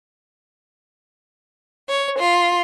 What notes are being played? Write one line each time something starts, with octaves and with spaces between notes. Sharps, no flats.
C#5
F4